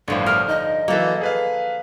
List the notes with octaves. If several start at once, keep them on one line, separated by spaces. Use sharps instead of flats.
G1 A2 D3 F3 G3
A#4 F6
D#4 D#5
E3 F#3 A#3 A4
G#4 B4 F5